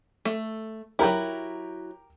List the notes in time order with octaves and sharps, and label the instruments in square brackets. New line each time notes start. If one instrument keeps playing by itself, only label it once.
[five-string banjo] A3
[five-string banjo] F#3 E4 [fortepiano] G4 A#4 G5